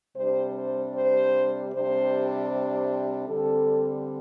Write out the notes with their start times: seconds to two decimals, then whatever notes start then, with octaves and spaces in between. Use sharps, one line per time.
0.16 C3 G3 D4 C5
0.54 C5
0.93 C5
1.72 C3 G3 D4 C5
2.50 C5
3.27 D3 G3 C4 A4